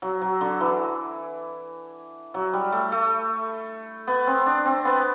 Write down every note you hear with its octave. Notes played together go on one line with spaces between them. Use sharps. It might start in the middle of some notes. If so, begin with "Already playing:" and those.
F#3
F#3
D3
E3
F#3
G3
A3
A3
B3
C4
D4
C4
B3